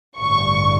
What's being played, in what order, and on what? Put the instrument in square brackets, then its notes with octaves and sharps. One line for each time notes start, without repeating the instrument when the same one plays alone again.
[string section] A1 G2 D3 G3 C#6